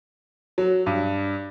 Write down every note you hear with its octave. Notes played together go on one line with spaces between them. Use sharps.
F#3
G2